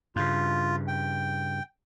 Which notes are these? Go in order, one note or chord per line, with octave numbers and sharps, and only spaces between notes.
G2 C#3 F4
G5